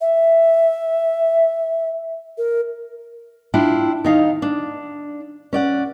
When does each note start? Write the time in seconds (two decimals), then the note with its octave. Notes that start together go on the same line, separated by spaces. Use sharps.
0.01 E5
2.38 A#4
3.54 D4 E4 F4 G5
4.04 D#3 D#4 F5
4.42 D4
5.53 C#4 D5 F#5